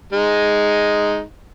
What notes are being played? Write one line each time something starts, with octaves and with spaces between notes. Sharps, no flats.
G#3 D#4